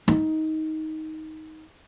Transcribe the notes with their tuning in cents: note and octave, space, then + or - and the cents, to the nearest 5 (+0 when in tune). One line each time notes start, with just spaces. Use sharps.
D#4 +15